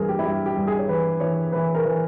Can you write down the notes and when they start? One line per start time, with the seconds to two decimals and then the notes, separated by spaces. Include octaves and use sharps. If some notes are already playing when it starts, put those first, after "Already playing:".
Already playing: G2 E3 G#4 A#4
0.09 G4
0.19 E4
0.25 G2 G4
0.46 G4
0.56 G2
0.67 G#4
0.79 C#5
0.88 E3 B4
1.20 E3 C#5
1.52 E3 B4
1.75 A#4
1.85 E3